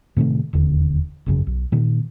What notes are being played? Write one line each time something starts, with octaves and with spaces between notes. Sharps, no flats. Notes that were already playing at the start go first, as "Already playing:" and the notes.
A2 C3 D#3 A3
E1 D#2 D3
G#1 F#2 C#3
B1
A#2 D#3 A#3